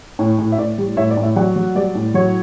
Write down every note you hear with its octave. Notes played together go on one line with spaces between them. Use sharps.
A2 C#5
A2
E5
A2 D5
G3
A2 C#5 E5
D5
A2
C#5 E5
F#3 D5 F#5
F#3
G3 D5
A2
F#3 C#5